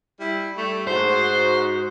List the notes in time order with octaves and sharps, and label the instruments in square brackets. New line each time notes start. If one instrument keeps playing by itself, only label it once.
[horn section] G3 E4
G3 A3
[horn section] G#2 [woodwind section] F#4 [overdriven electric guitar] C5